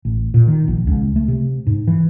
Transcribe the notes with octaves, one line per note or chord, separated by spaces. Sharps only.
A1
A#2
D#3
A#1
C#2
A3
C3
G#2
E3